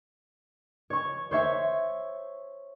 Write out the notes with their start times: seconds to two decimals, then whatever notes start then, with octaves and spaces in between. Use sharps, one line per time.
0.90 C#5 C#6
1.31 C5 C#5 E5 C#6